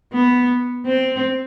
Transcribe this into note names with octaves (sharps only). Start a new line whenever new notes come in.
B3
C4